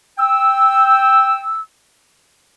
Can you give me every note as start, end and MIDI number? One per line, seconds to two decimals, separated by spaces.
0.18 1.60 79
0.18 1.60 88